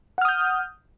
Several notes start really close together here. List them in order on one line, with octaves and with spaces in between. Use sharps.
F#5 F6 D#6 G6